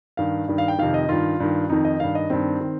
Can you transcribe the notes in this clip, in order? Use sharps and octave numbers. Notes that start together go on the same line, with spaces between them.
G2 D#3 F5
G2 D#3
F5
G5
F2 C3 D#3 F5
D#5
G2 D#3 F4
G2 D#3
F2 D#3 D#4
D#5
G2 D#3 F5
D#5
G2 D#3 C4
D#3